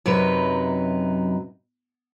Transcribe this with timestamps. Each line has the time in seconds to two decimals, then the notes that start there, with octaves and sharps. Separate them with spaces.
0.06 F#2 C3 F#3 D#4 B4